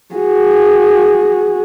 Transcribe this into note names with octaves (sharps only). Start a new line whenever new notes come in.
F#4 G#4